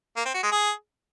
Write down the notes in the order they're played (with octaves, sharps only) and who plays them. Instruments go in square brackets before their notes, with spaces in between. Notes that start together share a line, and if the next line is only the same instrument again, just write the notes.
[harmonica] A#3
C4
F#4
G#3
G#4